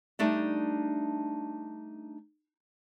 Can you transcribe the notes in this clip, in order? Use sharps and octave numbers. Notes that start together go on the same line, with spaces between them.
G3 A3 D4 D#4